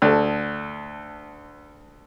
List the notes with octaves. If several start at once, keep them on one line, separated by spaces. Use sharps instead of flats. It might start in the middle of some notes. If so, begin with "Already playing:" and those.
D2 A4